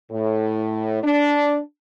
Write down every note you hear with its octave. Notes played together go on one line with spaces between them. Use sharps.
A2
D4